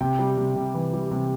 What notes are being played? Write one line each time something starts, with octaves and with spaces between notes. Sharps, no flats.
C3 G5
G3
C3
C3
E3
G3
C3